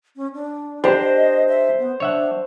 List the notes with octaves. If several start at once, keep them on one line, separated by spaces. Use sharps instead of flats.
C#4
D4
D4 G4 C5 D#5
E5
B3
D4 C#5 E5 F#5